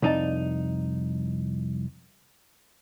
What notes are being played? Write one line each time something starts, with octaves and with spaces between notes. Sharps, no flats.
C2 F2 D#4 D5 A5